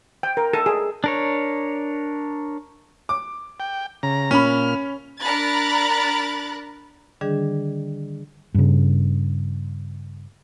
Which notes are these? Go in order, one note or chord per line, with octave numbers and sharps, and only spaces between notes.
G5
A#4
A4
G#4
D4 A#4 C#5
D6
G5
C#3 A#5
A#2 C#4 B5 F6
D4 A#4 A#5 B5 F#6 A6
D3 D#3 G3 D4 G#4
G2 C#3